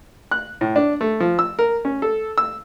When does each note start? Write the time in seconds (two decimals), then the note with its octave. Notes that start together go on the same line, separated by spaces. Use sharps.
0.31 F#6
0.61 A2
0.76 D4
1.01 A3
1.20 F3
1.39 E6
1.59 A#4
1.85 C#4
2.02 A4
2.38 E6